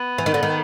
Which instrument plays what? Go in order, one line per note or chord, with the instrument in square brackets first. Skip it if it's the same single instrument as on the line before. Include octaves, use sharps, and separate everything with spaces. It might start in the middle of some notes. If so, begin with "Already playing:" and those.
Already playing: [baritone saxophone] B3
[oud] E3
D#3
D3
D#3